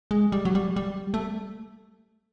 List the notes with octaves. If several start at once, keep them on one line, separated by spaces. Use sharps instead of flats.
G#3
G3
F#3
G3
G3
A3